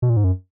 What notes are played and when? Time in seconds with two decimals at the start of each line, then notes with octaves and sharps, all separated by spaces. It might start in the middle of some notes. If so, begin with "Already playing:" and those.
0.02 B2
0.10 A#2
0.17 G#2
0.24 F#2